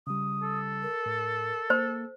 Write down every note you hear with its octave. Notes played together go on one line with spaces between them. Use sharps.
C#3 G3 D#6
A4
A#4
A2
A#3 C5